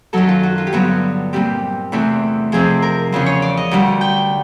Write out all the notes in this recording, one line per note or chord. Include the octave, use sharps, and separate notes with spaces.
F#2 D#3 F#3 A4
F4
F#4
F4
G4
G2 D3 F#3 B3 F#4
A#2 G3 C4 G4
E2 C3 E3 A3 C4
F2 C3 F3 G#4
A#4
E2 C#3 F3
C#5
D5
D#5
D2 D3 G3
G5